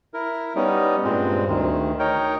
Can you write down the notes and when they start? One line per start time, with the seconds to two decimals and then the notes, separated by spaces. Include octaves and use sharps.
0.14 E4 A#4
0.56 G3 B3 C#4 D#4
1.04 G2 A#2 G#3 C4
1.48 D2 D#3
1.99 D#4 A#4 C#5 G5